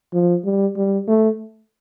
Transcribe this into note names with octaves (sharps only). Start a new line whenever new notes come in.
F3
G3
G3
A3